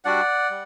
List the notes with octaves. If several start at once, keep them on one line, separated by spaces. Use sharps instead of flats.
G3 D4 F#4 D5 F#5
G3